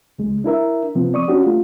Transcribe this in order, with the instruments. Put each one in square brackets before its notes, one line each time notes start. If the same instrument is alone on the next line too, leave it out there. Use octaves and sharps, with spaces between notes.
[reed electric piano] C#2 G#3
D4 E4 A#4 E5
C3 F3 B3 C4
D5 C#6 D#6
C#4 D4 F#4 G4
A3 F4